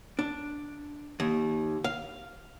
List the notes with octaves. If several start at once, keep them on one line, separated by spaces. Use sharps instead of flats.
D4
D#2
F5